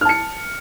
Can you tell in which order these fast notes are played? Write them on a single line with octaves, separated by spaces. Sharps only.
F6 A5 C#7